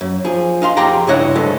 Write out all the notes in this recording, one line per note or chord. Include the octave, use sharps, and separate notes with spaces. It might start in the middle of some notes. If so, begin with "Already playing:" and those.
F#2
F3 G#4
D#4 F5 C6
F2 D#4 G4 G#4 G5 A#5
G2 C#3 E4 C#5 D#5 F#5
C2 G2 G#3 A4